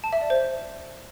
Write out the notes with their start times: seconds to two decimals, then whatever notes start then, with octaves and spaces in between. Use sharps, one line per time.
0.04 A5
0.13 E5
0.21 D5
0.30 C5